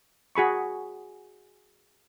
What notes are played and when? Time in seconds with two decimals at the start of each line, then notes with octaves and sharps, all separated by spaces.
0.35 F#4 G#4 B5 C#6